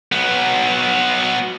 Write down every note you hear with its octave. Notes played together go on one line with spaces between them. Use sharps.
F#3 B3